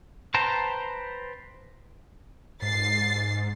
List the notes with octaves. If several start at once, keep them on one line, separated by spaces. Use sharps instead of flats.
B4 C5 G5 A5 A#5
G#2 A6 C7